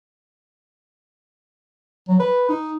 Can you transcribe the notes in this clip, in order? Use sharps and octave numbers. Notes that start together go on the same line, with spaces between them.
F#3
B4
D#4